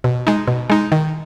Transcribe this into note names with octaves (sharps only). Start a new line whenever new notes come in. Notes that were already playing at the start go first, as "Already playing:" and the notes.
B2
G#3 D#4
B2
G#3 D#4
D#3